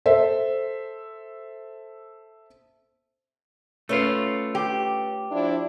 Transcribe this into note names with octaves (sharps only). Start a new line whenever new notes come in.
A4 C5 E5
A3 C#4 F4 B4
G4
F3 D4 E4